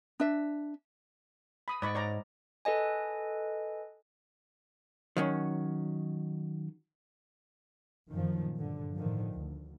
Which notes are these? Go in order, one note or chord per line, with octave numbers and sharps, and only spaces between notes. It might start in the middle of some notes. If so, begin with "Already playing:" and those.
D4 E5
B5 D#6
G#2 D5 B5 C#6
C#5 D5 A#5
A4 B4 D#5 G#5
D#3 F#3 C#4
F#2 A#2 D#3 F3
G2 D3
A2 D3 D#3 F3
D2